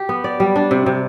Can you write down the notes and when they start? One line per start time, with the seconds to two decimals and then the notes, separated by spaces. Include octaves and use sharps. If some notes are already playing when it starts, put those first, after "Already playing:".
Already playing: G4
0.09 B3
0.24 D5
0.40 G3
0.56 D4
0.71 C3
0.86 C3